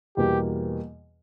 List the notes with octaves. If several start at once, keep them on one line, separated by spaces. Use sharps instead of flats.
E2 B2 G3 A#3 G4